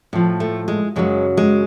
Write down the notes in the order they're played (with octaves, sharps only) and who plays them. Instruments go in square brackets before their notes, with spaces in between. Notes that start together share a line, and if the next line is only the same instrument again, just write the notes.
[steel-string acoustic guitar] A2 F3
A3
G#3
F#2 C#3 F#3 G#3
G#3